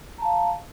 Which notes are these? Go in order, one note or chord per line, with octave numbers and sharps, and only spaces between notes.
F5 A5 A#5